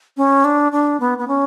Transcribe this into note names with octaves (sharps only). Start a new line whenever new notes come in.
C#4
D4
D4
B3
B3
C#4